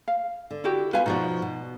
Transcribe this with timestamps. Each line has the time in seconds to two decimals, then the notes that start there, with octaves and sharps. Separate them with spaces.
0.08 F5
0.51 D3
0.64 E4 F#4 G4
0.93 B3 E4 F4 B4 F5 G#5
1.06 B2 F3 D#4 F#4 D5
1.42 B2